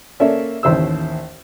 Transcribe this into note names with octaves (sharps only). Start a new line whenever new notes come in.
A#3 C#4 A4 C#5 D5 E5
A1 D#2 C5 E5 E6